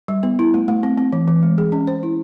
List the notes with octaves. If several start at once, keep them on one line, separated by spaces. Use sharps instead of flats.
G3
B3
E4
A3
A3
C4
C4
E3
E3
G#3
G#4
C#4
C5
E4